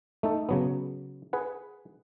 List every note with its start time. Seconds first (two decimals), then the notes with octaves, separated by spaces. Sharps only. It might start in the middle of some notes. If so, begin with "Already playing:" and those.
0.23 A3 D#4 A4
0.49 C#3 F#3 B3
1.33 G#4 B4 F#5